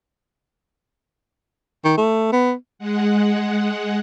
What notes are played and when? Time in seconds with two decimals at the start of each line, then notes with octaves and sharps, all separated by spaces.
1.84 D#3
1.97 A3
2.32 B3
2.79 G#3 F#5